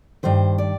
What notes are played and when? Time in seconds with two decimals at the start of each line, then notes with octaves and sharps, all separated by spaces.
0.23 G2 D#3 C5
0.58 D5